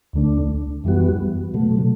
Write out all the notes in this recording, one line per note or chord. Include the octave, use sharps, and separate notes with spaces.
D2 D3 A3 D4
F#2 E3 G3 B3 F#4
B2 F#3 A3